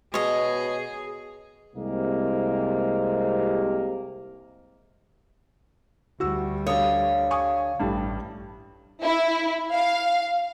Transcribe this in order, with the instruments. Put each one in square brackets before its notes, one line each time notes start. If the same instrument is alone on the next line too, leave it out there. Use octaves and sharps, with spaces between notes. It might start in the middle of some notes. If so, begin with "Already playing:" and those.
[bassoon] B2 [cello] G#4 [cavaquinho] C#5 D#5
[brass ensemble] C2 C3 G#3 A#3
[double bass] D2 G3 [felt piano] F#4 E6
[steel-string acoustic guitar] D3 C#5 [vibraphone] F5 [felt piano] D#6
[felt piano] G#5 C#6 D#6
[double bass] A1 [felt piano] G2 G3 A3
[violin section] E4
F5